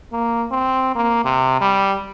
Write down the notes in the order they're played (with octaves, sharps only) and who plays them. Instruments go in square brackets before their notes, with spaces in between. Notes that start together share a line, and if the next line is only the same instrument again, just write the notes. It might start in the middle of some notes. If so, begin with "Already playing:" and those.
[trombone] A#3
C4
A#3
C3
G3